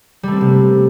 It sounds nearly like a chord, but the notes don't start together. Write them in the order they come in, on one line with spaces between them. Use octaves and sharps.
G3 A3 C4 A#3 C3